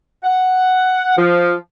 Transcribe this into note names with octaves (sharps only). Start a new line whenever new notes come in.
F#5
F3